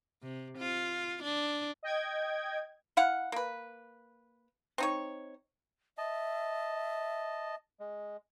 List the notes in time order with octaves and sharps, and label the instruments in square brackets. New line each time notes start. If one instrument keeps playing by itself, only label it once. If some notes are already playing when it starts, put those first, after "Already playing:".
[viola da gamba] C3
F4
D4
[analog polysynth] D#5 G5 G#6
[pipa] E4 F5 F#5
A#3 B4
C4 D#4 C#5
[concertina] D#5 A5 [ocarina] E5
[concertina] G#3